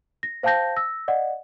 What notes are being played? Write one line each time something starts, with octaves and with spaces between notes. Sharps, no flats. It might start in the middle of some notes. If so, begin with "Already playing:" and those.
A#6
C5 F5 G5 A5 G6 A#6
E6 A#6
D5 D#5 F#5